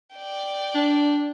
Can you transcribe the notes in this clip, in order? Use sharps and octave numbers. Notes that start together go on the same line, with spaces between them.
D5 G5
D4